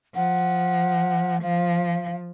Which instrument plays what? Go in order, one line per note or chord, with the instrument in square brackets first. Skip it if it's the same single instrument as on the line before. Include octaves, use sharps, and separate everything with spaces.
[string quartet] F3 [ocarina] F#5
[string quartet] F3 [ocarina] F5